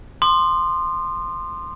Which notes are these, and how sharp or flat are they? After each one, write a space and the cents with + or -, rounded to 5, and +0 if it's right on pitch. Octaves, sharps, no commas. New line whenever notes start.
C6 +0 D#6 -45